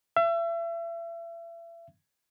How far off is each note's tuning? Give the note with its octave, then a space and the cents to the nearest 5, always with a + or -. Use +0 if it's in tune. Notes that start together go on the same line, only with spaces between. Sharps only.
E5 +35